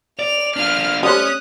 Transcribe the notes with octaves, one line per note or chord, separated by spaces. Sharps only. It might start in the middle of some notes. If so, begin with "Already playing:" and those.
D5 F7
D4 F4 F6
G3 A3 C#4 C5 D#6 F#6